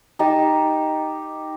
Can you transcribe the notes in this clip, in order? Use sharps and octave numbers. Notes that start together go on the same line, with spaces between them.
D#4 G4 A5